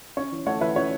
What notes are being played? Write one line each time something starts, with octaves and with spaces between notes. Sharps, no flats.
C#4 C#5
E3
A3 C#5 F#5
E3 B4 E5
C#4 C#5